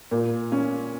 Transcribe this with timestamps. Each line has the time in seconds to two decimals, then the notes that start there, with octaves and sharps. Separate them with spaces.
0.11 A#2
0.52 C#4